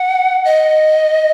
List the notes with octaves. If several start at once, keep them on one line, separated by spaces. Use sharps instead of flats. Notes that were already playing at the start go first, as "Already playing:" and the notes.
Already playing: F#5
D#5